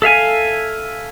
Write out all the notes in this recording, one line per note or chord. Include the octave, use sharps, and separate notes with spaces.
A4 E5 F5 G#5